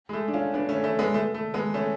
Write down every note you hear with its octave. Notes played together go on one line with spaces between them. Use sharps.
G#3
A3
D4
C#4 F4
B3 D4
A3 C#4
A3 C#4
G#3 B3
A3
A3
G#3 B3
A3 C#4